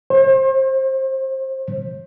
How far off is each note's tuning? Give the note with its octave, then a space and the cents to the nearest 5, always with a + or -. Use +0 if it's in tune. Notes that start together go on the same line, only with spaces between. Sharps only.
C5 +40